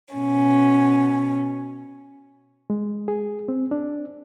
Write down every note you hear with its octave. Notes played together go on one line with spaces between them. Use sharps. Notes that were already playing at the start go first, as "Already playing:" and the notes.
B2 C#4
G#3
G#4
C4
D4